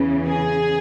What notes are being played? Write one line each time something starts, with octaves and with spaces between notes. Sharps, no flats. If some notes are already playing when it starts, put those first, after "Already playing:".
Already playing: E2 C#3 E3
G#4